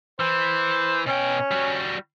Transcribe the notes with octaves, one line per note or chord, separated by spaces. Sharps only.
E3 C5
B2 C#4 G5
G3 F#4